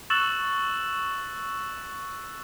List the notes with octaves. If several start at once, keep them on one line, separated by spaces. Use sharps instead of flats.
C#6 E6 F#6 A6 E7 F#7